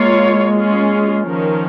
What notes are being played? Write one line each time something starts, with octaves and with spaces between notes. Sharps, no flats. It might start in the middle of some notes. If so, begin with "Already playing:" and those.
Already playing: G#3 A#3 F4 C#5
A#3 C#4 F4 G#4
D#3 F3 C#4 A#4